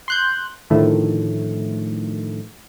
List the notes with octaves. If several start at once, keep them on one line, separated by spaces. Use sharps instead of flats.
C6 F#6 G6
A2 D3 D#3 F3 A3